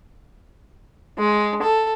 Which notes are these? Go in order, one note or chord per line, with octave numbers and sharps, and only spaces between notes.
G#3
A4